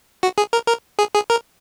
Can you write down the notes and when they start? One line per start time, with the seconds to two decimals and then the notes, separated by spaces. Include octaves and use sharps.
0.23 F#4
0.38 G#4
0.53 A#4
0.68 A#4
0.99 G#4
1.15 G#4
1.30 A#4